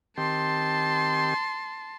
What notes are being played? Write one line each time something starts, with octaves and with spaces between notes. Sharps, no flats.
D#3 C4 G4 A5 C6